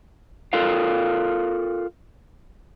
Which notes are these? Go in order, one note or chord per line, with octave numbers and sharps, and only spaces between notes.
F4 A4 A#4 F5